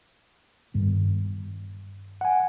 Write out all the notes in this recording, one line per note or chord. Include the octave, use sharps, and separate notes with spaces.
G2 D#3 B3
F#5 G#5